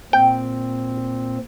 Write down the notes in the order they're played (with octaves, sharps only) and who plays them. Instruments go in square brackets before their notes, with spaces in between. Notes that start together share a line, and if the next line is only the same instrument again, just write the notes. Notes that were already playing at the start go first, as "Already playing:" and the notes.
[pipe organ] A#2 C4 [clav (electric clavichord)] G5